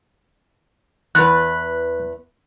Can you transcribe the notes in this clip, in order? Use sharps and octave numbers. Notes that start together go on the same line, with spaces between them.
E2 B4 F#6